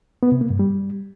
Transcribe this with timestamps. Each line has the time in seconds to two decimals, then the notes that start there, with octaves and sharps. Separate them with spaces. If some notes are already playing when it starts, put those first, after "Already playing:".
0.23 B3
0.32 C3
0.41 A#3
0.50 G2
0.59 G3